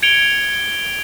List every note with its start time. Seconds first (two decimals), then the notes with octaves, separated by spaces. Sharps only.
0.02 G#6 C#7 D7 F7 G7